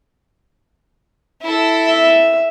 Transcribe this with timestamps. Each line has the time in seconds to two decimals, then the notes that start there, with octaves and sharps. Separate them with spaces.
1.42 E4 A4
1.87 E5